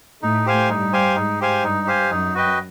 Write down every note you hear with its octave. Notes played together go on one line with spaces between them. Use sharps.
A2 A3 D#4
G4 C5 F5 G#5
G2 G3 D#4
G4 C5 F5 G#5
G#2 G#3 D#4
G4 C5 F5 G#5
G2 G3 D#4
G4 C5 F5 G#5
F#2 F#3 D#4
F#4 B4 D#5 G5